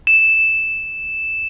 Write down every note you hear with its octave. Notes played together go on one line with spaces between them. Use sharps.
E7